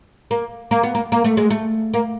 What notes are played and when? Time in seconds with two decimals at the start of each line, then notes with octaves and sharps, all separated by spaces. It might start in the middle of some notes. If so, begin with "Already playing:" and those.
0.31 A#3
0.71 A#3
0.83 B3
0.95 A#3
1.12 A#3
1.24 A3
1.37 G#3
1.50 A3
1.94 A#3